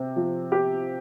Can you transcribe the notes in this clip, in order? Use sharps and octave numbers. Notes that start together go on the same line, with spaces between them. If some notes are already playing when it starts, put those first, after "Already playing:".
Already playing: C3 C4
F3
G4